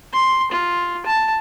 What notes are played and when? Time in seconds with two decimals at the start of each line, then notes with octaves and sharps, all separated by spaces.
0.13 C6
0.52 F4
1.06 A5